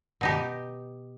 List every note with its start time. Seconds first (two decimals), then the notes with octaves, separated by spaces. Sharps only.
0.21 B2 D#4 G4